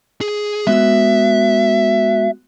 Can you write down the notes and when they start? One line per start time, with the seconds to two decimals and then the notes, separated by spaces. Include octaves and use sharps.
0.21 G#4
0.67 G#3 B3 F#4 E5